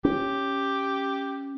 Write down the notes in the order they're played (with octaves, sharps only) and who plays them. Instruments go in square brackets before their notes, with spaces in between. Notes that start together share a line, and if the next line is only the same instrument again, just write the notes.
[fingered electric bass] C#4 [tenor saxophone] G4